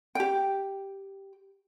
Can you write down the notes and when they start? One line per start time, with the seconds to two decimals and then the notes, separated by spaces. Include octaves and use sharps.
0.15 G4 G5